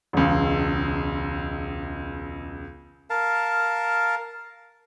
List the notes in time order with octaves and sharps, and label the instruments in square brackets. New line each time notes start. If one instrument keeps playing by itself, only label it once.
[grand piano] E1 C#2
[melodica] A#4 F5 A5